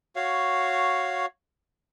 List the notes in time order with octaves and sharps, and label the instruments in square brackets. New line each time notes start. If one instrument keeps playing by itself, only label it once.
[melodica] F#4 C#5 F5